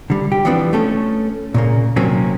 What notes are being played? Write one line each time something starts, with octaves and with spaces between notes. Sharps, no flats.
D3 G3
G4
E3 F3 G3 B3 C4 D4
A3 C#4 A4
A#2 C#3 A#3
C3 D#3 F#3 A#3 C4 C#4